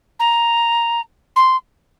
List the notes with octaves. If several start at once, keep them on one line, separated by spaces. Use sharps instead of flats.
A#5
C6